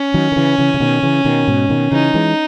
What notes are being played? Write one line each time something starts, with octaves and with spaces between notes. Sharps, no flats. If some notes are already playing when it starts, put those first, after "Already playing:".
Already playing: C#4
D#3 F#3
D#3
C#3 E3
C#3 E3
C#3
B2 D#3
C#3 E3
B2 D#3
G#2 B2
B2 D#3
C#3 E3 D#4
E3 G#3